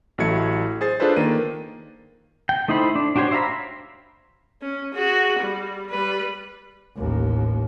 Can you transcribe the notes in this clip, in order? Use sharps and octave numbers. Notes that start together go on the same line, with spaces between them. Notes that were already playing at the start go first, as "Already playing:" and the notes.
A1 F#3 A3 E4 G#6 C#7
G#4 C5 A6 C7
D4 F4 G#4 A4 B4 C5
D#3 A#3 D#7
G5
A3 D#4 E4 C5 B5
D4
D4 F#4 G4 C5 C#5
C5 E5 F5 A#5 B5
C#4
F#4 G#4
G3
G3 B4
A1 D#2